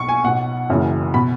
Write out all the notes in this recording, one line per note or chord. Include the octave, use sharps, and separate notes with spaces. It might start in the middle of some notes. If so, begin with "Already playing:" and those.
Already playing: B1 B2 C#6
G#5
B1 B2 F#5
F#1 F#2 C#3 E3
B2 B5